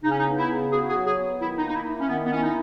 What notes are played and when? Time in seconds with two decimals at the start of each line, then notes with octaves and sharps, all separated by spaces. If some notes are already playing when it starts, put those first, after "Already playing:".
0.03 C#3 D#4
0.11 C#4
0.18 D#4
0.26 B3
0.38 E4
0.49 C#3
0.72 F#4 G#4
0.89 G#4
0.95 F#3
1.06 G#4
1.18 B3
1.41 D#3 E4
1.58 D#4
1.63 A#3
1.69 D#4
1.75 E4
1.86 E4
2.01 C#4
2.09 D#3 B3
2.25 B3
2.32 C#4 E4
2.43 D#4